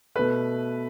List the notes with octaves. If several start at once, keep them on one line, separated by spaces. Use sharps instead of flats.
B2 A3 B4